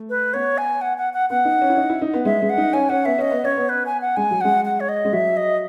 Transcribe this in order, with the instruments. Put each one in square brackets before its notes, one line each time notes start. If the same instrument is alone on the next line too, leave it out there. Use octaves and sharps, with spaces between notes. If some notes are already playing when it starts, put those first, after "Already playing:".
Already playing: [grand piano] A3
[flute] B4
[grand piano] B3 [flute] C#5
[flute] G#5
F#5
F#5
F#5
[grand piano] B3 [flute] F#5
[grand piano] D#4
C#4
E4
D#4
E4
D#4
B3
[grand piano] G#3 [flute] E5
[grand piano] G#3
[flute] F#5
[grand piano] D#4
[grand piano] C#4 [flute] G#5
[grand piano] C#4 [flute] F#5
[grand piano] B3 [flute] E5
[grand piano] C#4 [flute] D#5
[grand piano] B3
[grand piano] C#4 [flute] C#5
[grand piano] B3
[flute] B4
G#5
F#5
[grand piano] G#3 [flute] G#5
[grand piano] F#3
[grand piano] G#3 [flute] F#5
[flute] F#5
C#5
D#5
[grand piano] G#3
[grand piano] F#3 [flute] E5
[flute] D#5